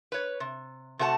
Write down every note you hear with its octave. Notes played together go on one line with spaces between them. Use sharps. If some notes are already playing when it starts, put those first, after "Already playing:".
B4 C#5
C3
C3 A3 F#4 B4 A5